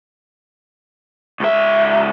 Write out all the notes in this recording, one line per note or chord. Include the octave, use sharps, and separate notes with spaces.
C#2 E5